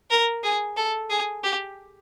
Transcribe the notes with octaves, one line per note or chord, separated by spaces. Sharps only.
A#4
G#4
A4
G#4
G4